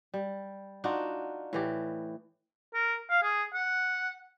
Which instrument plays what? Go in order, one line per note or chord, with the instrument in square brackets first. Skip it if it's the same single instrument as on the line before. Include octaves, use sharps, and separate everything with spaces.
[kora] G3
D4 D#4 F4 F#4
A2 E3 G4
[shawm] A#4
F5
G#4
F#5